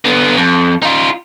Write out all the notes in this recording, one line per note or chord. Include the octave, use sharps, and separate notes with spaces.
D3 B3
F2
D#4 F4